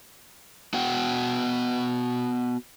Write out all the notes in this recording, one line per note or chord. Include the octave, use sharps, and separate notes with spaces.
B3 F#4 F#5 G5